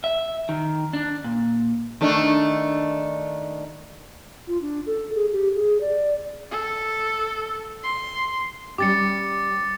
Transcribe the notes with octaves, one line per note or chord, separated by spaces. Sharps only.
E5
D#3
D4
A#2
D#3 A3 D4
F4
D4
A4
G#4
G4
G#4
D5
A4
C6
G3 C#4 G4 D6 A6 C#7